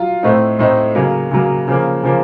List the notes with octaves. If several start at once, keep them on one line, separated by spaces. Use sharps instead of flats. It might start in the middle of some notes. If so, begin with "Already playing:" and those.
Already playing: F#3 F4
A2 A3 C4 D#4
A2 A3 C4 D#4
C#3 F#3 A#3
C#3 F#3 A#3
C#3 F3 A#3
C#3 F3 A#3